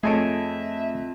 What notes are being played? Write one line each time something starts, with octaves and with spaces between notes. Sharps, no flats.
F2 A3 G#4 A4 C#5 D#5 E5 D7